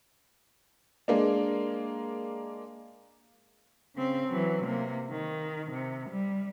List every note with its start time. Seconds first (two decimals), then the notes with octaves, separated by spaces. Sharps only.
1.08 G#3 A#3 D4
3.96 C#3 C4
4.28 E3 F#3
4.64 C3 A#3
5.10 D#3
5.71 C3
6.09 G3